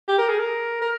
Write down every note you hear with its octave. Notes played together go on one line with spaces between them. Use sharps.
G4
A#4
G#4
A#4
A#4